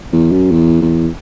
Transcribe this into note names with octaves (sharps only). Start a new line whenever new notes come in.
E2
F#2
E2
E2